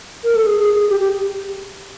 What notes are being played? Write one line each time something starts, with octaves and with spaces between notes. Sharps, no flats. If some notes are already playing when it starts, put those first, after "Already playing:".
A#4
A4
G#4
G#4
G#4
G4
G4